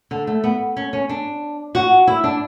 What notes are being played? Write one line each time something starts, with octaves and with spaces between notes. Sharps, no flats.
D3
A3
B3
C#4
C#4
D4
F#4
E4
D4